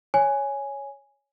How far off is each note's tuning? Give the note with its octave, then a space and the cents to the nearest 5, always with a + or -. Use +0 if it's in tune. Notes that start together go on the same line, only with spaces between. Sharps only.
C#5 +0 G#5 +0